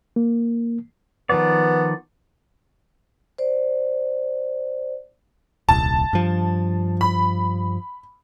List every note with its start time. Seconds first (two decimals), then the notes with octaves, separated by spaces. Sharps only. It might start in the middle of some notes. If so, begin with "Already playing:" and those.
0.16 A#3
1.29 D#3 F3 B3 D5
3.38 C5 D5
5.69 D#1 C2 A5
6.13 G2 F3
7.01 B5